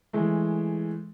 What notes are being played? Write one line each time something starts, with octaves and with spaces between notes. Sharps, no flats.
E3 G#3 A3